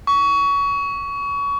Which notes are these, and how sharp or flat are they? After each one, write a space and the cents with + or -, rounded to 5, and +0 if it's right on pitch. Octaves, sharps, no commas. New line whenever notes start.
C#6 +25